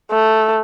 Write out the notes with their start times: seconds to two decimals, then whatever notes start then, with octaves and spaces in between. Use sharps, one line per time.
0.11 A3